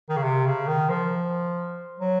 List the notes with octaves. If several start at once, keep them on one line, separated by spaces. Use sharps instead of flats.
D#3
C#3
C3
C#3
D#3
F3
F#3